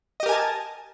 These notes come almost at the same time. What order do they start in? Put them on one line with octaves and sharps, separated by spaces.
D#5 G4 A#4 G#5 A5